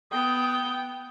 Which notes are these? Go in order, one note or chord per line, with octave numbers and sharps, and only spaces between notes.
B3 G5 D#6